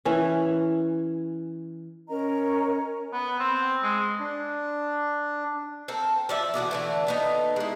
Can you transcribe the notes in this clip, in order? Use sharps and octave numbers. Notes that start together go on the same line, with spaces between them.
E3 C#4
C#4 A#4 D#5 A#5
B3
C4
G#3
D4
C4 A4 A#4
F3 D5 E5
B2 D3 E3 F#5
D3 E3 A3
A3 B3 D#4
G#3 E4